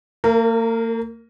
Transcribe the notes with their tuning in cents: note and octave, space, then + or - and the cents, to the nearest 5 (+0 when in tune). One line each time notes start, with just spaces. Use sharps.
A#3 -40 A#4 +0